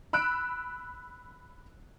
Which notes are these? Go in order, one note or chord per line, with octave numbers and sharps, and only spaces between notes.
B5 E6 F#6 D7